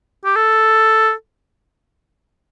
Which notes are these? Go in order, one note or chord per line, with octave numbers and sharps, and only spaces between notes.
G4
A4